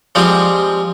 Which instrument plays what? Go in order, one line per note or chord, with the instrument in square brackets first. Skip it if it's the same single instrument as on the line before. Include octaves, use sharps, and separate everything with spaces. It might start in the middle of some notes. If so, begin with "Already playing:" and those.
[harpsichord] F3 G3 G#3 C4 F4